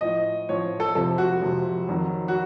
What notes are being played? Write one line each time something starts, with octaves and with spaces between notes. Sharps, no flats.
A2 F3 D#5
A2 F3 C#5
A4
F2 C3 F3 A4
F#4
F2 C3 F3
F2 D#3 F#3
F#4